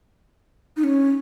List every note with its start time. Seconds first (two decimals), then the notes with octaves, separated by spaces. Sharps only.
0.76 D#4
0.83 C#4